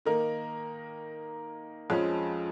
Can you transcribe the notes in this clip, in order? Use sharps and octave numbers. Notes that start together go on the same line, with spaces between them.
D#3 A#3 D#4 A#4
F2 F3 G#3 C#4